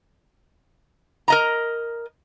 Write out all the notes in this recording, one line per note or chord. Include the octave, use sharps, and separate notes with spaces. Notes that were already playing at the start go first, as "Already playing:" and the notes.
A#4 D#5 A#5